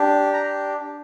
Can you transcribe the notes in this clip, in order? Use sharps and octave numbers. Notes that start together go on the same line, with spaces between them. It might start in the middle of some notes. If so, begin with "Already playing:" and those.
Already playing: D4 G4
A#5